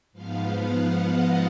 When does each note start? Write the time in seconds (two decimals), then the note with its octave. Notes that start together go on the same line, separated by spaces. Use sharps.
0.13 G#2 F3 B3 F5
0.58 F#5
1.02 D#5